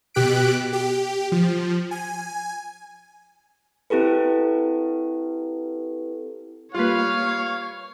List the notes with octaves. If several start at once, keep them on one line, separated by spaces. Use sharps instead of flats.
B2 G4 F#6 B6 D7
G4
F3
G#5
C4 E4 G4 A4 B4
G3 A#3 F4 B4 C#5 F5